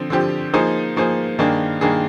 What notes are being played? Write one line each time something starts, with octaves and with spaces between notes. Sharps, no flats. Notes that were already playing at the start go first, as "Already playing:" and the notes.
Already playing: D3 F3 C4
D3 F3 C4 G4
F3 A#3 D#4 G#4 C5
F3 A#3 D#4 G#4 C5
G2 D#3 A#3 D4 G#4
G2 D#3 A#3 D4 G#4